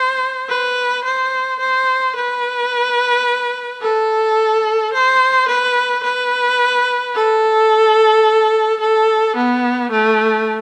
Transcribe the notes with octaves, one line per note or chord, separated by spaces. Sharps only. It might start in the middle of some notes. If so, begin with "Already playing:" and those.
Already playing: C5
B4
C5
C5
B4
A4
C5
B4
B4
A4
A4
B3
A3